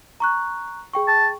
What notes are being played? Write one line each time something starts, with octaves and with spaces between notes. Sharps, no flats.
A#5 C#6 F#6
G#4 G5 C#6
A5